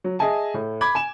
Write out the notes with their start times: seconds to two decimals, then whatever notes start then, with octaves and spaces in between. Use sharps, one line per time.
0.04 F#3
0.19 G#4 D#5 E5 G#5 A5
0.54 A2
0.81 B5 D6 G#6
0.95 G#5 E7